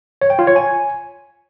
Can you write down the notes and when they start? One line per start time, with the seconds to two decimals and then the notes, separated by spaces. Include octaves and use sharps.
0.22 C#5
0.30 G5
0.39 F4
0.47 C#5
0.56 G#5